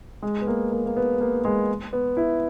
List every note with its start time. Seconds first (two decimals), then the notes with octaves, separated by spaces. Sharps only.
0.22 G#3
0.41 B3
0.47 A#3
0.72 A#3
0.86 A#3
0.96 B3
1.21 A#3
1.45 G#3
1.93 B3
2.17 E4